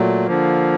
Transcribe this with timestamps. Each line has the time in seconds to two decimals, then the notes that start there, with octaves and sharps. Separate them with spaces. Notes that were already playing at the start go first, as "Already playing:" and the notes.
Already playing: A#2 F#3 A3
0.27 D3 F3 A#3